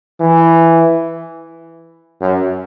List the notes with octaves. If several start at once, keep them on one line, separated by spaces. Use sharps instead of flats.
E3
F#2